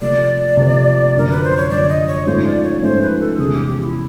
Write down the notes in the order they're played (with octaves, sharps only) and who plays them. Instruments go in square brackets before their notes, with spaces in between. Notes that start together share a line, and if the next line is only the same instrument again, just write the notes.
[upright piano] C3 F3 A3 C4 [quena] D5
[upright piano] C3 F3 A3 C4
[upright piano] F#2 D3 F3 A3 D4 [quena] A#4
[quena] B4
C5
C#5
[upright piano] F#2 D3 F3 A3 D4 [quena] D5
[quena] D#5
C#5
[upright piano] G#2 F3 A3 C#4 F4 [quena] C5
[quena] D5
C#5
[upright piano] G#2 F3 A3 C#4 F4 [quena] C5
[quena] B4
A4
[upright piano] E2 C3 F3 G#3 C#4 [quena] G#4
[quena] G4
G4
F4
E4